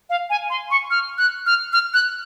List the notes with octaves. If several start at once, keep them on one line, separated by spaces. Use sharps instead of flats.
F5
G#5
C6
C#6
F6
F#6
F6
F6
F#6